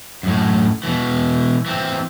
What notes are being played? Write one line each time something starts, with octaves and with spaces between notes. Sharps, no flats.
F#2 A2
B2 E3
E3 C4